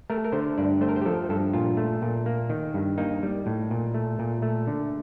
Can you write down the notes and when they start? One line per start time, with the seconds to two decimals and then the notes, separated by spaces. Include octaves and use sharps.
0.10 A3 A#4
0.24 A#4
0.33 D3 C5
0.58 G2 D5
0.81 A3 C5
0.89 A#4
0.96 C5
1.01 G4
1.06 F3 A4
1.29 G2 A4
1.54 A#2 F4
1.77 A3
2.02 A#2
2.26 A#3
2.49 D#3
2.74 G2
2.98 A#3 D#4
3.23 G3
3.46 A2
3.71 A#2
3.94 A3
4.19 A#2
4.42 A3
4.67 D3